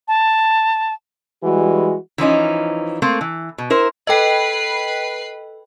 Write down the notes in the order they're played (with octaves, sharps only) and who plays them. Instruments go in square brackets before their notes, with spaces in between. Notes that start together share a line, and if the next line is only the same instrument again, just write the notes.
[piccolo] A5
[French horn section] E3 G3 G#3 F#4
[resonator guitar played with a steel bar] E3 F3 C#4 D#4
A3 A#3 C4
E3
B2
E4 A#4 C5
[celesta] A4 E6 [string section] B4 C7 [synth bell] D#5 G5